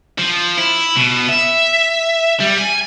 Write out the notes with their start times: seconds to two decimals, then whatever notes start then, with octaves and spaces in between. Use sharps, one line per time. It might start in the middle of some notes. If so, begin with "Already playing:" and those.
0.18 F3
0.58 E4
0.96 B2
1.29 E5
2.40 G3
2.58 G#5